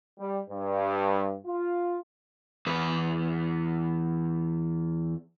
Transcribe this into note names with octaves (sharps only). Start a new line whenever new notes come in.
G3
G2
F4
E2 B4